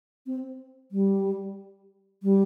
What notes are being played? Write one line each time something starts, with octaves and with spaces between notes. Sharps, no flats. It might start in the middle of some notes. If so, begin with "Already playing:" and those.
C4
G3
G3